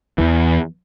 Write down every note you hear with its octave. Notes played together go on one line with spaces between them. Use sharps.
E2 E3